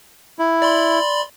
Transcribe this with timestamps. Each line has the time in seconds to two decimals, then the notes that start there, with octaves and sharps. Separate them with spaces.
0.39 E4
0.62 D5 B5 C6